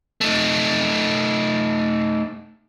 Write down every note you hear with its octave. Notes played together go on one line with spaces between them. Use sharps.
A3 D#4